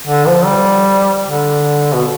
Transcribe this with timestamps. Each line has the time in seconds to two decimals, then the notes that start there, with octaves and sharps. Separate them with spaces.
0.07 D3
0.27 F3
0.46 G3
1.26 D3
1.94 B2